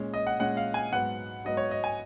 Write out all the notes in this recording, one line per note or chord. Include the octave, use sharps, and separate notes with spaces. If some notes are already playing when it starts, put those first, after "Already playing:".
Already playing: A#2 G#3 C#4
D#5
F#5
A#2 G#3 C#4 F#5
F5
G#5
G#2 F#3 B3 F#5
G#2 F#3 B3 D#5
C#5
D#5
G#5